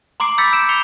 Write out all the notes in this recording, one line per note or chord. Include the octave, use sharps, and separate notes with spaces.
A#5 C6 D6 C7 D7
B5 E6 G6 A6 B6 C#7
E6 D7 E7
C6 C7 C#7 F7 G7